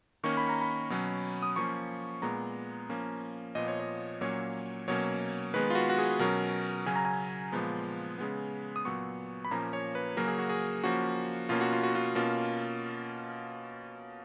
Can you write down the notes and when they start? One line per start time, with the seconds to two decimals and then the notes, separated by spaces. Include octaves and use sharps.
0.24 D#3 A#3 C#4 C#6
0.37 B5
0.49 A#5
0.61 B5
0.90 B2 F#3 C#4
1.43 D#6
1.56 F3 A#3 C#4 C#6
2.22 A#2 G#3 B3 A#5
2.90 F3 A#3 C#4
3.55 A#2 F3 B3 D#5
3.68 C#5
3.80 D#5
4.21 A#2 F#3 A#3 C#4 C#5
4.88 B2 F#3 A#3 C#4 C#5
5.54 D#3 G#3 B3 B4
5.70 F4
5.75 F#4
5.90 F#4
5.98 G#4
6.19 B2 F#3 C#4 A#4
6.86 C#3 F#3 C#4 G#5
6.96 A#5
7.05 G#5
7.52 A#2 F3 G#3 B3
8.18 C#3 G#3 B3
8.76 D#6
8.85 A#2 F#3 B3 C#6
9.45 B5
9.51 A#2 F3 A#3 C#4 A#5
9.73 C#5
9.95 B4
10.17 C#3 F#3 A#3 C#4 A#4
10.28 G#4
10.39 F#4
10.49 G#4
10.83 F3 A#3 C#4 F#4
11.49 B2 A#3 C#4 F4
11.61 F#4
11.73 F4
11.83 F#4
11.95 F4
12.15 B2 A#3 C#4 F4